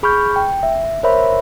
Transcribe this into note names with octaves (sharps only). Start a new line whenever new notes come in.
G#4 B5 C#6 F6 G6
G5
E5
A#4 C5 C#5 E5 B5